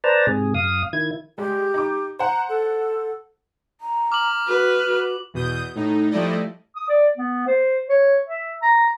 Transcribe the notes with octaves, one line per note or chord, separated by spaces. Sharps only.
B4 C5 D5 A5 A#5
G#2 C3 G#4
F#2 F5 D#6
D#3 E4 G#6
G3 G#3 G4
D#4 D6
C5 F#5 A#5
A4
A#5
D6 F6 F#7
F#4 B4
F#4
E2 B2 D#6 G6
A2 D#4
F3 G3 A3 E4 D5 D#5
D#6
D5
B3
C5
C#5
E5
A#5